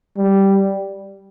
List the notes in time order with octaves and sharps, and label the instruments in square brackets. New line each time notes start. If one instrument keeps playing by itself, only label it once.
[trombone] G3